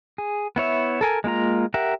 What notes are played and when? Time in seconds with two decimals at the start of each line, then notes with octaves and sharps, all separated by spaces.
0.18 G#4
0.56 B3 E4 C#5 E5
1.01 A4 A#4 G#5
1.24 G#3 A#3 F4 A#5
1.74 G4 A#4 E5 F#5